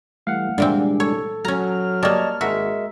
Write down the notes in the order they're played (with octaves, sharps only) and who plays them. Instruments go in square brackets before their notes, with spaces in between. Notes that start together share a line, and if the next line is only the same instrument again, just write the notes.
[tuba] E3 [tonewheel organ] G3 A3 [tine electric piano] F5 F#5
[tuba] C2 [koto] A#2 E3 C4 [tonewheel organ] G3 G#3 D4
[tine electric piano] A4 [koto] C#5
[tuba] F#3 [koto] C#4 A#5 [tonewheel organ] F6
[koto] G3 A#3 [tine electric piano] C#5 D#5 A5
[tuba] G#1 [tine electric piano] G#3 A#4 E5 [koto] F#4